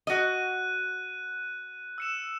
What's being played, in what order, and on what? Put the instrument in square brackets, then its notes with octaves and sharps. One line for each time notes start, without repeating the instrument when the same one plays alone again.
[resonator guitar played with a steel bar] F#4 D#5 [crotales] F#6 D#7
[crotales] E6 C#7 E7